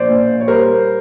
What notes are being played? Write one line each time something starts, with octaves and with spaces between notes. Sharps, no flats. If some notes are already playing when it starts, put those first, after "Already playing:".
Already playing: A#1 C5 D5
A#2
C#5
G3 A#4 C5